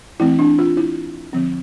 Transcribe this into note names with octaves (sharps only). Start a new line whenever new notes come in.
E3 A3 C4 E4
D4
F4
E4
D3 F3 C4